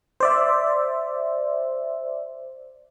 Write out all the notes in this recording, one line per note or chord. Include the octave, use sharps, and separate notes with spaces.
C5 D5 E5